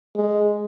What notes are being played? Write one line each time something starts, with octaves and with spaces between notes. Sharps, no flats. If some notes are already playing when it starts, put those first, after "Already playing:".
G#3